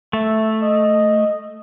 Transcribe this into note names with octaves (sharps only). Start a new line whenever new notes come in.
A3 E5
D#5